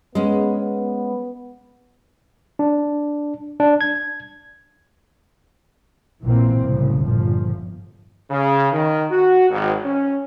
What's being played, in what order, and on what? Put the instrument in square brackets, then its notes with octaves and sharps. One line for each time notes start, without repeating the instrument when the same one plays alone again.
[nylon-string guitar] G#3 C#4 [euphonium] B3
[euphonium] B3
[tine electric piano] D4
D4
G#6
[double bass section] A#1 A#2 E3 A#3 C4
C2 F#2 A2 C#3
G1 E2 A#2 F3
[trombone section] C#3
D#3
F#4
G#1
C#4